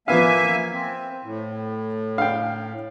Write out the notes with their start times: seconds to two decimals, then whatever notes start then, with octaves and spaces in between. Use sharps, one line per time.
0.08 F3 A#3 B3 E5 F5 G#5
0.73 C4
1.23 A2
2.18 F5 G5